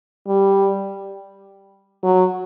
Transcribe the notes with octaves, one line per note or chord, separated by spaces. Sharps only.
G3
F#3